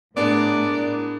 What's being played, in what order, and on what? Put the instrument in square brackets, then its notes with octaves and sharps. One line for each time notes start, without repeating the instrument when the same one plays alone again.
[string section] A2 [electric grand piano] B3 D4 G#4 [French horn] A#4 [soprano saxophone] D5